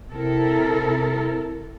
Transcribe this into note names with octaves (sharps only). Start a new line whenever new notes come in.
C3 E4 A4 A#4